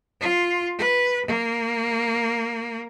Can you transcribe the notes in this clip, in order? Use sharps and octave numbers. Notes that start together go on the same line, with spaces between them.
F4
B4
A#3